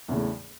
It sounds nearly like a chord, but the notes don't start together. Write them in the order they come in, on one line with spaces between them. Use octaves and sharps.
E2 C#3 A2